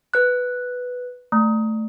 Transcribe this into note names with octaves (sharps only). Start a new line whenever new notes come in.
B4 F#6
A3